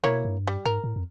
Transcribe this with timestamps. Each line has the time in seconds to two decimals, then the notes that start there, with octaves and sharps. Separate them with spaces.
0.04 B2 A#3 E4 C#5
0.25 G2
0.47 G3
0.65 G#2 A#4
0.84 A2
0.96 F2